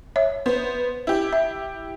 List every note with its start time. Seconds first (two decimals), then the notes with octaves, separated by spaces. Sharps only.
0.16 C#5 E5
0.46 B3 C5
1.07 E4 G4
1.33 E5